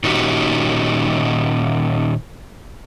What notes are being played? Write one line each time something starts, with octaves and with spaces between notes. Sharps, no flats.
A#2 D#3 C#4 D#4 F#4 G4